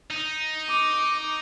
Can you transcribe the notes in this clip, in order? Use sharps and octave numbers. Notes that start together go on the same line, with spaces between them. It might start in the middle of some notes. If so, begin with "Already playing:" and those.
D#4
D6